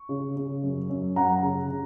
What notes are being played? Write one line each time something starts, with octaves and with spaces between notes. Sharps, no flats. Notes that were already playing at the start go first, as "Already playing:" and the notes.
Already playing: C#6
C#3
C#3
F#2
F#2
F#2 F#5 A#5
C#3
C#3